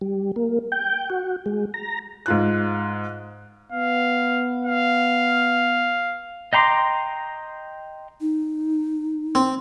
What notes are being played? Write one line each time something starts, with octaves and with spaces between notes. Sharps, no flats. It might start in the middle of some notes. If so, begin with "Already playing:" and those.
G3
A#3
G5
F#4
G#3
A#5
G#2 F4 F#6
B3 F5
F5
D#5 G5 A#5 C6 D6
D#4
C4